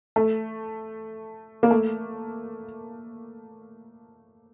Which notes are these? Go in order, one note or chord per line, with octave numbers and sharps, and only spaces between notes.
A3
A#3
A3